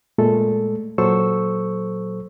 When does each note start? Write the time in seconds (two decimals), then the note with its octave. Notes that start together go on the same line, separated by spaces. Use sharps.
0.18 A#2 G#3 A3 A4
0.98 A#2 F#3 A4 C5 C#6 E6